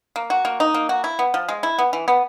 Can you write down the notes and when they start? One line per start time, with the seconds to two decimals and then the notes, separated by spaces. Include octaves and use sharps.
0.16 A#3
0.30 F#4
0.45 A#3
0.60 D#4
0.74 A#3
0.89 F#4
1.04 E4
1.19 B3
1.34 F3
1.49 G#3
1.63 E4
1.79 B3
1.93 E3
2.08 B3